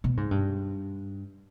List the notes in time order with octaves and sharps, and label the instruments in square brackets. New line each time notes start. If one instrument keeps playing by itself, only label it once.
[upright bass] B2
G#2
G2